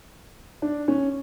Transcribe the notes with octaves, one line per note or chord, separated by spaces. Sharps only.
D4
C#4